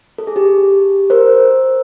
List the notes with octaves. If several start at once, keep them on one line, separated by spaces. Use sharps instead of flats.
A4
G#4
G4
A#4 C5